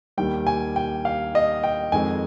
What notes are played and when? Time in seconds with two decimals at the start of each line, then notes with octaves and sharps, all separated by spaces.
0.17 D#2 D#3 G3 G5
0.47 G#5
0.76 G5
1.05 F5
1.35 D#5
1.63 G5
1.92 F2 D#3 G#3 G#5